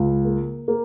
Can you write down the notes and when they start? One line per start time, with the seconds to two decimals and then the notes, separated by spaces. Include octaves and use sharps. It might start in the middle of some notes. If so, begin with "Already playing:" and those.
Already playing: C#2
0.25 A#3
0.68 A#3